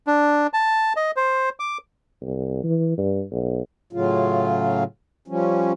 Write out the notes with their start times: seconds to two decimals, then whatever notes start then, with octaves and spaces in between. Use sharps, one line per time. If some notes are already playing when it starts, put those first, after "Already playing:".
0.07 D4
0.53 A5
0.96 D#5
1.16 C5
1.60 D6
2.21 C2
2.64 E3
2.97 G2
3.32 B1
3.93 A2 C#3 F#3 F4
5.28 F3 G3 C#4